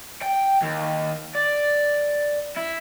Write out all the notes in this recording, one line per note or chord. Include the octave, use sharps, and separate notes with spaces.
G5
D#2
D5
E4